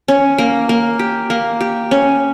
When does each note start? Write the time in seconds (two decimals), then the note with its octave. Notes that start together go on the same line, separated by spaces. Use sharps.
0.08 C#4
0.38 A#3
0.69 A#3
0.99 G4
1.30 A#3
1.61 G4
1.91 C#4